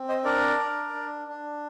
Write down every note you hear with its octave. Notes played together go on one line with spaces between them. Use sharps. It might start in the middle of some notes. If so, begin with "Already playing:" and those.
Already playing: C4
C5 D#5
D4 A#4 D5
D4
D4
D4